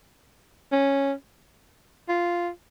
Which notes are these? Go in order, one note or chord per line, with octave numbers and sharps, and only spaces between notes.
C#4
F4